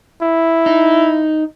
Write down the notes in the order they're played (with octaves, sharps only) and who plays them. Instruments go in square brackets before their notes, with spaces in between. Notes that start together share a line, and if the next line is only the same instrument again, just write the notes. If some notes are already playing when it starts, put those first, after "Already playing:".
[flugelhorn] E4
[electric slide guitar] D#4